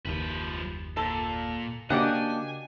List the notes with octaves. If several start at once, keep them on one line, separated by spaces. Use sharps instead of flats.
F#1 D#2 F3 B4
A#2 A4
C#3 A#3 D4 F#4 G4 D#5 F#5 G#5